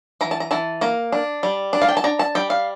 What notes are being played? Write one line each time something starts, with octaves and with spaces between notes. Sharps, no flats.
E3 A#5
A5
A#5
E3 A5
A#3 A#5
D4
G3
D4
F5
G5
A5
D4 A#5
A5
G3 G5
F5